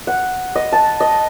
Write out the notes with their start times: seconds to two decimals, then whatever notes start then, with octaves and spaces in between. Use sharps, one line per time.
0.07 F#5
0.56 D#5
0.72 A5
1.00 D#5